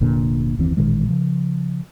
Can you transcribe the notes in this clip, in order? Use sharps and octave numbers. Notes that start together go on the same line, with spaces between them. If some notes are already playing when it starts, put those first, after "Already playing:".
F1 A#2 D3
F#1 D#2 E3 C4
A1 A#2 D#3 G#3
C#3 F3